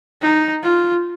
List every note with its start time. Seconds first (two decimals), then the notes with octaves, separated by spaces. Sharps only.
0.22 D#4
0.63 F4